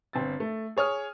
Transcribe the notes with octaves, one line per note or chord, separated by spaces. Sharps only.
G1 C4 A6
A3
G#4 C#5 D#6 F6